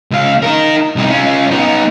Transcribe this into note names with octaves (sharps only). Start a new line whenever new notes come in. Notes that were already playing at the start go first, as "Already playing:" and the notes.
C#2 F5
D#4 A#4
C2 D#4
C#4 F4
B3 D#4